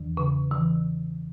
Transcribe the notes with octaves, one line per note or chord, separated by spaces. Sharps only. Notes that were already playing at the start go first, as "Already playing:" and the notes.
Already playing: E2 E3
C#3
E3